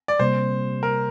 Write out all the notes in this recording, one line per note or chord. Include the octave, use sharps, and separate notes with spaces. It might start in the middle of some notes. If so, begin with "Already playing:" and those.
D5
C3 G3 A#3 C5
A#4